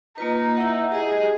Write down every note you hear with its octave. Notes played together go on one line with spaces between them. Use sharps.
A#3 D#4 F4 B4
E4 E5 F#5
G4 G#4 D#5